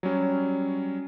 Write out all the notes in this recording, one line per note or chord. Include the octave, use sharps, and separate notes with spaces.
F#3 G3 C#4